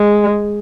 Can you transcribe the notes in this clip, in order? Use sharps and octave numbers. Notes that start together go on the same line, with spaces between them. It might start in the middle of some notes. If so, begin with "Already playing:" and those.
Already playing: G#3